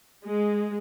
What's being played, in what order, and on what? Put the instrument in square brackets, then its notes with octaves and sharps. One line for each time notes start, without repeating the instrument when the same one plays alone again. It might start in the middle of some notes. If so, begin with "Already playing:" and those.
[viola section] G#3